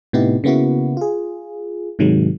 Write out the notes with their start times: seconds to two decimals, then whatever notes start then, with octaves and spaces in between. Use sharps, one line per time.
0.13 A2 C3 B3 D#4 E4 G4
0.44 C#3 A#3 B3 E4 F#4
0.97 F4 G#4
1.99 G#2 C3 D#3 F#3 G#3